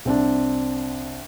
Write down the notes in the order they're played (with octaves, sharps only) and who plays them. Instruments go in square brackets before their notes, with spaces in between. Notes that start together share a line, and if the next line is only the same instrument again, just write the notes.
[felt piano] C2 C4 D4